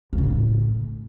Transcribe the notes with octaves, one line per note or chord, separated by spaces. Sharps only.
F2
C#3
A2